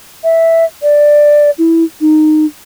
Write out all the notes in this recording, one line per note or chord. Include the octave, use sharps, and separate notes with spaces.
E5
D5
E4
D#4